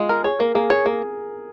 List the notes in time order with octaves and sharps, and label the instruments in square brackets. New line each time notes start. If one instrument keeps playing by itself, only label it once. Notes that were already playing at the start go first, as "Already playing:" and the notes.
Already playing: [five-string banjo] G#3 [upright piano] F4 G#4
[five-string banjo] A#4
[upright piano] G#4 [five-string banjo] C#5
[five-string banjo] A#3 [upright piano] A#4
[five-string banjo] A#3 [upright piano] G#4
[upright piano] G#4 [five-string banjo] C#5
[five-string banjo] A#3 [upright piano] G#4